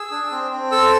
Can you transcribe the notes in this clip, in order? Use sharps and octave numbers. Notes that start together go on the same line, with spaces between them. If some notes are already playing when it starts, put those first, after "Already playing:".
Already playing: G#4 E6
D4
C4
C4
A4 E6